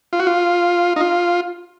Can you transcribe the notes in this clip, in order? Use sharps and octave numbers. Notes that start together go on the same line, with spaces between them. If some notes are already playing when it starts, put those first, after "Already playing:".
F4
F#4
F4
D#4
F4